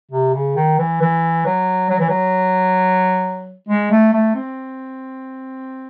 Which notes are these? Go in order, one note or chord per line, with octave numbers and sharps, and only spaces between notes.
C3
C#3
D#3
E3
E3
F#3
F#3
E3
F#3
G#3
A3
A3
C4